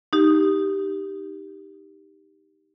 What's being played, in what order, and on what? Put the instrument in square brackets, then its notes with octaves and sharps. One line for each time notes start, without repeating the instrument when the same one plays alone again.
[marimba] D#4 G4